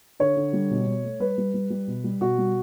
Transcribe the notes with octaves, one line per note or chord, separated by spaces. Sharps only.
D3 C#5
D3
G3
B2
B2
A3
G3 B4
G3
G3
G3
B2
G3
B2 F#4
G3